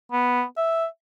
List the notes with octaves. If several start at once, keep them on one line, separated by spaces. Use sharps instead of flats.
B3
E5